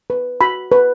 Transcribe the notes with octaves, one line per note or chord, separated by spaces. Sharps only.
B4
F#4 B5
B4